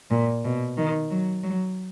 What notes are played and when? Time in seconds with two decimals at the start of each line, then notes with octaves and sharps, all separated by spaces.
0.11 A#2
0.45 B2
0.77 D#3
1.11 F#3
1.43 F#3